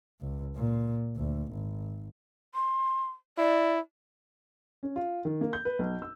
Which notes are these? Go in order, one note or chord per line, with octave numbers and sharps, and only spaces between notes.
C#2
A#2
D2
G#1
C6
E4 D5
C#4
F4
D#3
A#3
G6
B4
B1
E6